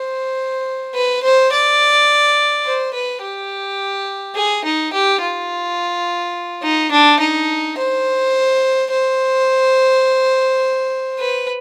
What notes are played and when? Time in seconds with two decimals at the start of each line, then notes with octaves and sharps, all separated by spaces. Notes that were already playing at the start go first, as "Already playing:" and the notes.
Already playing: C5
0.94 B4
1.23 C5
1.52 D5
2.65 C5
2.94 B4
3.22 G4
4.35 G#4
4.65 D#4
4.93 G4
5.21 F4
6.63 D#4
6.92 D4
7.20 D#4
7.78 C5
8.91 C5
11.19 B4